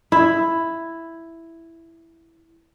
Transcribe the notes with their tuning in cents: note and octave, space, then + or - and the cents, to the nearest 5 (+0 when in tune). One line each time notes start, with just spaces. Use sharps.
E4 +5